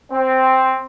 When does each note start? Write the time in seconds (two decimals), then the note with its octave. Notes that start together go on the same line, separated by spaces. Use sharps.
0.11 C4